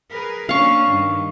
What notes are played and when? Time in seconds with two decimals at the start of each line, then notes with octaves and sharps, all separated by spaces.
0.11 G#4 A#4 B4
0.49 A#3 C#4 D4 F5 C#6
0.87 G2 D#3